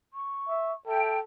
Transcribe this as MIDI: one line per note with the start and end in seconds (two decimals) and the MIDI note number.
0.14 0.72 85
0.49 0.73 76
0.87 1.23 69
0.87 1.10 76
0.87 1.17 79